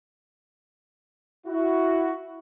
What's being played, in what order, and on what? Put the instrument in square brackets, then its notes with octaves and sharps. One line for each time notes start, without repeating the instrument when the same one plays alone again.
[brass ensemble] E4 F#4